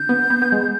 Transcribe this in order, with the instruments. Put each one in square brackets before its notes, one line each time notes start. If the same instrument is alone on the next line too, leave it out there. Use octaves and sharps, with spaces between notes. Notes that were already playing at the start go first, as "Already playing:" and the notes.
Already playing: [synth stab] D3 [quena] G6
[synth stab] B3
B3
B3
G#3